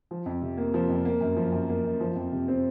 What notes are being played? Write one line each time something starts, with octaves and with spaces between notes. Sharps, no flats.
F3
F2
C3
A#3
F3
F2
A#3
F#2
F3
F#2
A#3
F#2
F3
F2
C3
C4